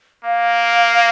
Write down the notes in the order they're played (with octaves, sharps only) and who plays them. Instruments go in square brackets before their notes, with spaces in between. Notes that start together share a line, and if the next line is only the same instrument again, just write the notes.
[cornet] A#3 [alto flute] F5